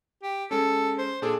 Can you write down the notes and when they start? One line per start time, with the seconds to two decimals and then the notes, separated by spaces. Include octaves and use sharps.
0.23 G4
0.51 G#3 C#4 A4
0.99 C5
1.22 A#2 D4 G#4 A4